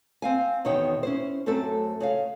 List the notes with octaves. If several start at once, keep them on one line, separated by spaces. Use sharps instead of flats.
C4 F5 G#5
E2 B2 D#3 D#4 C#5 G5
C#4 E4 C5
F#2 A3 C4 F#4 A4
C#3 C#5 F5